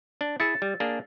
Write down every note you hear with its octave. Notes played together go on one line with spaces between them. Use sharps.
D4
E4 G#4 E6 A6 C#7
G3
A#3 D4 G#4